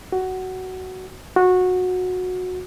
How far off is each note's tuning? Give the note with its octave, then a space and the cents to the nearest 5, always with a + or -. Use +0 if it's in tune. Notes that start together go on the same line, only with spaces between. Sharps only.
F#4 +10
F#4 -20